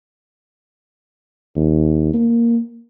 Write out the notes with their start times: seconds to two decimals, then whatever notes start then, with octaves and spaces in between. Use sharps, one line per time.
1.56 D#2
2.13 A#3